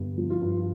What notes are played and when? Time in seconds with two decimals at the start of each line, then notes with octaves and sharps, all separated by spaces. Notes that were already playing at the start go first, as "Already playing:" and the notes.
Already playing: G1 G2
0.17 F3
0.30 F4
0.41 G2